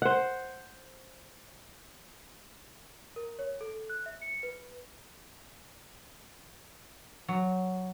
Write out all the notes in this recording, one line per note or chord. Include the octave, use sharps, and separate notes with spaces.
C5 F#5
A#4
C#5
A4
F#6
E5
C#7
B4
F#3